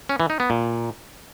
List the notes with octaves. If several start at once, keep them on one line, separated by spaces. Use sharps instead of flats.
C#4
E3
D#4
B3
A#2